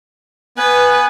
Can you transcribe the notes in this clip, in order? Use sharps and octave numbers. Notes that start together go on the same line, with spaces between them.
B3 B4 G#5 F#6